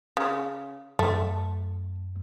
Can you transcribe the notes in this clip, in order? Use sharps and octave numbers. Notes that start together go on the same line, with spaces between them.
C#3
F#2 A3